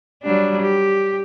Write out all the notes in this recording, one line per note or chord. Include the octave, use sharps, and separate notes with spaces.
F#3 G3 D4
G4